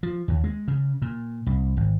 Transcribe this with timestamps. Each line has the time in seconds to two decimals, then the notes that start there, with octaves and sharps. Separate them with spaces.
0.03 F3
0.28 D#2
0.44 G#3
0.68 C#3
1.02 A#2
1.46 C2
1.77 G#1